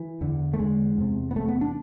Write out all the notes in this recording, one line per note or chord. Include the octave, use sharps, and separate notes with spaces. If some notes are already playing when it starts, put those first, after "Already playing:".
Already playing: E3
E2 D3
A3
E2 D3 G#3
E2 C3
B3
E2 C3 A3
B3
D4